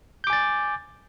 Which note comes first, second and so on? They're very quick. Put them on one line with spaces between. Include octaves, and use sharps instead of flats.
G6 D6 G#5 A6